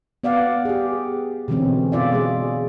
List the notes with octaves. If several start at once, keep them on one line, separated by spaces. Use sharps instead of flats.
B3 D5 F5 F#5
G4 G#4
B2 D3 E3 G#3 C4 C#4
B2 F4 D5 E5
G#3 G#4